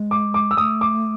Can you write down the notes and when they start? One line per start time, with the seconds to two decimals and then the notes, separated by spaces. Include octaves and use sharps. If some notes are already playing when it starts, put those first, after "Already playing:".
Already playing: G#3
0.11 D6
0.34 D6
0.51 E6
0.57 A3 D#6
0.81 D6